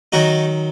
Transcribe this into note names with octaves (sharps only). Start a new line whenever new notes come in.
D#3 F#3 D#4 F#4